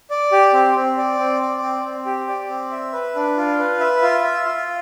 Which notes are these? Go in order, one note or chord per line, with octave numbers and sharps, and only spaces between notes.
D5
G4
C4
C4
D5
C4
D5
C4
C4
G4
D5
C4
E5
B4
D4
F4
B4
E5
F4
E5
F4